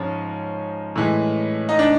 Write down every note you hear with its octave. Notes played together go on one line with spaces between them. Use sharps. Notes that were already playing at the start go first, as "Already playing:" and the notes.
Already playing: G#2 F3 G#3 C#4
A2 E3 G#3
D#4
D4